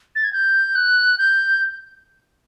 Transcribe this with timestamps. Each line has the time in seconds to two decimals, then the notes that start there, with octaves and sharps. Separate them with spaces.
0.15 A6
0.24 G#6
0.33 G6
0.75 F#6
1.18 G6